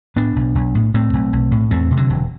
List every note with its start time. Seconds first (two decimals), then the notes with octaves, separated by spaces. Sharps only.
0.16 A2 B3 D4
0.36 B1
0.55 B1
0.75 A2
0.94 A2 A3 C4
1.13 B1
1.33 B1
1.51 A2
1.71 E2 A3 C4
1.91 C3
1.97 D3 F#3
2.10 E1